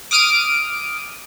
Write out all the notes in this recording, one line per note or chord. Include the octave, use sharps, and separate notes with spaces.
D6 D#6 F6 D7 D#7